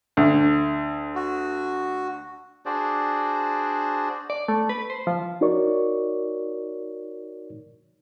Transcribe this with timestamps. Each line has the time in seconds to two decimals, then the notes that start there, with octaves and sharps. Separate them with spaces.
0.17 D2
1.15 F#4
2.66 D4 F#4 G#4 C5 D5
4.30 D5
4.48 A3
4.69 B4
4.90 C5
5.07 F3
5.41 D#4 F#4 A#4 C#5 D5 C#6